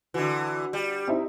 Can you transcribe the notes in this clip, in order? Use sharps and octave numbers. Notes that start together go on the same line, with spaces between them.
D3 E3 F#4
G3
C4 D#4 E4